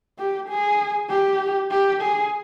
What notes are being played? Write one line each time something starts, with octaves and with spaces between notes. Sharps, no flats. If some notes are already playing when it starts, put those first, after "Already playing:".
G4
G#4
G4
G4
G#4